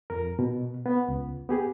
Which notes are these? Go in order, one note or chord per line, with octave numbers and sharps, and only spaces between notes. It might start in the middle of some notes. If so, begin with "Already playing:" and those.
F2 A#4
B2
B3
C#2
B3 G4 G#4